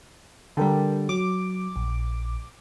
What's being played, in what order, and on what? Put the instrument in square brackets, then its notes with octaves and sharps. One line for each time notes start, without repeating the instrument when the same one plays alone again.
[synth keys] D3 G3 [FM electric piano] A#4 G5 A5
[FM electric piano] F#3 [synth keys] D6
[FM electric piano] A#1